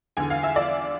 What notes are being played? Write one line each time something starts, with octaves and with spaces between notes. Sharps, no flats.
E2 D3 G#5
F5
E5
D5